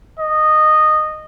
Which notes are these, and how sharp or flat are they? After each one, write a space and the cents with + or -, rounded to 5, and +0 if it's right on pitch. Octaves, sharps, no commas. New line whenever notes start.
D#5 -15